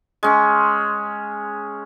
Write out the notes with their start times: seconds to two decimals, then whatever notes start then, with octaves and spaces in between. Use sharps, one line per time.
0.23 G#3 C#4